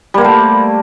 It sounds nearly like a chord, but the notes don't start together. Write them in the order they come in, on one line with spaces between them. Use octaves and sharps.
G3 A#3 C5 A3